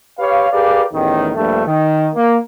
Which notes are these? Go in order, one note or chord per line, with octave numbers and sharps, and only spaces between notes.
G4 B4 C#5 F5
G4 G#4 A#4 B4 D5 F5
A1 E2 D#3
A#1 G2 A3
D#3
A#3